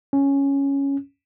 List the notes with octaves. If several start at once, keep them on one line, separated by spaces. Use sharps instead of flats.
C#4